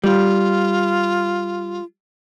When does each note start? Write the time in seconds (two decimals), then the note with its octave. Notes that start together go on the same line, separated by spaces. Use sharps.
0.04 G3 F4